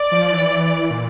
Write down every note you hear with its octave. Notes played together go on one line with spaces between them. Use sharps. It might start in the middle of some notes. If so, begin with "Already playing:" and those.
Already playing: D5
F3
E3
A#2